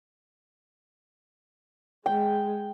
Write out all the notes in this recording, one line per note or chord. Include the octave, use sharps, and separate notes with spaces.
G#3 G5